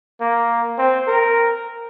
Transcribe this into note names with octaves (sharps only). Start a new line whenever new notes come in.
A#3
C4
A#4